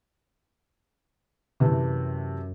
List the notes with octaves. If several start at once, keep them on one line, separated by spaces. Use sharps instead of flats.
F#2 C3 E3 A3